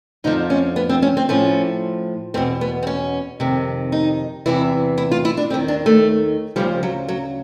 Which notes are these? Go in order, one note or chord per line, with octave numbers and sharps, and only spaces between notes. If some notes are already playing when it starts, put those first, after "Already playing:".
F2 D3 F3 D#4
C#4
B3
C4
C#4
C4
A2 F3 C#4
E2 B2 C4
B3
C4
C#4
F2 C3 D#3
D#4
E2 C3 E3 E4
E4
F4
E4
D4
D#2 D#3 C4
D4
A3
D2 C#3 F3 G3
F#3
F#3